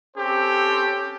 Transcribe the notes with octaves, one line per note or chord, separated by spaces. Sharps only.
C4 C#4 G4 A4 C5